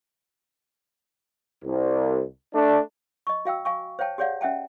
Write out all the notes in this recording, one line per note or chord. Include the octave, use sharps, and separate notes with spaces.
C2
A3 D4
D#5 C#6
F#4 F5 G5 E6
F5 G#5 C#6
C5 C#5 F5 G5 A5
G4 G#4 C#5 D5 F5 F#5
C#4 E5 F#5 G5 A5